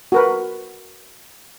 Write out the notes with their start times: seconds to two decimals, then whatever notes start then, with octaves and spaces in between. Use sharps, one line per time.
0.12 F#4 A#4 B4